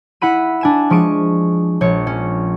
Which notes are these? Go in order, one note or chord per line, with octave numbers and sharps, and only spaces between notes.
E4 F#5 B5 D#7
D4 G#5 E7
F3 G#3 C#6 D7 D#7
A#1 C#5
C#4